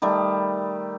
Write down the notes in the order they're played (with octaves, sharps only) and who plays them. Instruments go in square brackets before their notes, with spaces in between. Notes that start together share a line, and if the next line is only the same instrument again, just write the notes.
[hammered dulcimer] D#3 G3 A3